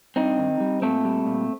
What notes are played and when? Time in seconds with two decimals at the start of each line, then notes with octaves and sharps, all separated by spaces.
0.16 G2 C4 D#4
0.39 D#3
0.60 G3
0.82 A#2 A3 C4
1.04 G3
1.26 A#2